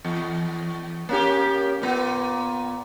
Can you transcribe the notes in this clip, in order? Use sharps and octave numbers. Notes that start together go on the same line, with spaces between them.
E2
A#3 C#4 G4
A#2 B3